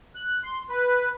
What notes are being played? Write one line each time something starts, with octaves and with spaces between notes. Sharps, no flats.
F#6
C6
B4